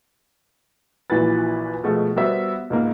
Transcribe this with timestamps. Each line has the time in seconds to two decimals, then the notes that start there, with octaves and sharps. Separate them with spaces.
1.10 A#1 A#2 E3 F#4 B4 A6
1.84 B2 F3 G#3 A3 F#4
2.16 G3 B3 F#4 A#4 C5 E5
2.70 C#2 G#2 A#3